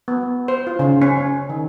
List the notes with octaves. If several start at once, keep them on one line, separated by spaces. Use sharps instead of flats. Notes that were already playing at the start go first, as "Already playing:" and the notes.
B3
C5
F4
C#3
C#4
C#4
D#3